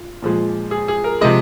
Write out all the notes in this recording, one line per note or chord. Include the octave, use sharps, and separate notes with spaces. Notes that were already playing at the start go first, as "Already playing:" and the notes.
Already playing: F4
A#2 F3 G#3
G#4
G#4
A#4
C3 F3 G#3 D#5